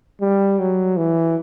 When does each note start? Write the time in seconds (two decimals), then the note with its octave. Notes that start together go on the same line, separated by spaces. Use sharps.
0.21 G3
0.59 F#3
0.97 E3